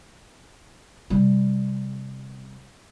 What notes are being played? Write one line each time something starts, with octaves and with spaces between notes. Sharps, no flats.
C3 G3